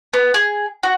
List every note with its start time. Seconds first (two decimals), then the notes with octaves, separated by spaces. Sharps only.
0.13 B3
0.34 G#4
0.83 F#4